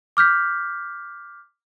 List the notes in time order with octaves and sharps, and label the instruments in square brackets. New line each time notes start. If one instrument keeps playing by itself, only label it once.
[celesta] D6 F6 G6 B6